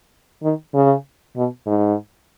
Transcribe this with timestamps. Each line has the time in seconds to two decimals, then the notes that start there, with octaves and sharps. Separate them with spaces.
0.43 D#3
0.74 C#3
1.36 B2
1.66 G#2